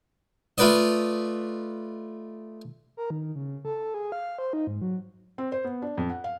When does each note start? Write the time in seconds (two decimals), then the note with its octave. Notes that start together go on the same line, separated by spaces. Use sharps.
0.58 A3 F4 B4 D5 D#5
2.97 A#4
3.10 D#3
3.35 C#3
3.65 A4
3.94 G#4
4.12 F5
4.38 C5
4.53 D#4
4.67 G#2
4.82 F#3
5.38 C4
5.52 C5
5.64 B3
5.82 D4
5.98 F2
6.10 F#5
6.24 F5